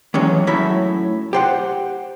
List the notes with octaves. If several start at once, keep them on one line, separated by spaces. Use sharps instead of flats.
E3 F#3 G#3 C#4
F#2 A2 E4 C#5 E5 B5
G4 C5 F#5